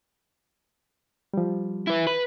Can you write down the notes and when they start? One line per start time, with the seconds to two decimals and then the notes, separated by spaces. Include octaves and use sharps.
1.34 F3 G3
1.87 E4 B4
2.07 B4